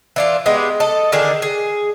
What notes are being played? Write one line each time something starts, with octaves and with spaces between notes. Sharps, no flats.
E3 D4 F4
G#3 B3 G4
A4 D#5
D3 D#3 D4 G#4
G#4